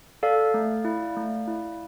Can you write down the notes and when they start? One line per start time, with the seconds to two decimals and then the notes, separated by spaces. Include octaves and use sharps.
0.23 A4 D5 F5
0.54 A3
0.85 E4
1.16 A3
1.47 E4